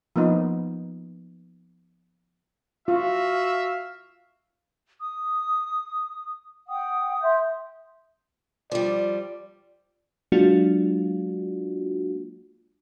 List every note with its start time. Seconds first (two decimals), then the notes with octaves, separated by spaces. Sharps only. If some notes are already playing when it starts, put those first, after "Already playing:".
0.16 F3 A#3 B3 D#4
2.88 F4 F#4 E5 F5
5.01 D#6
6.69 F#5 G5 D#6
7.22 E5 C6 G6
8.72 F3 G3 D5
10.32 F#3 G#3 A#3 D4 F4 F#4